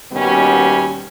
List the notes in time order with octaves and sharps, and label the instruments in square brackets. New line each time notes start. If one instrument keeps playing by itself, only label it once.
[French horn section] D#2 B2 G3 B3 C#4